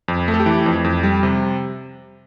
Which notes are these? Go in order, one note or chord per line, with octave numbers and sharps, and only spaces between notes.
F2
A3
A4
G4
E3
F2
F2
G3
C3